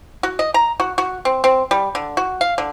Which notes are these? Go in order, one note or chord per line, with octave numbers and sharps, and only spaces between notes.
F#4
D#5
A#5
F#4
F#4
C4
C4
G3
D3
F#4
F5
D3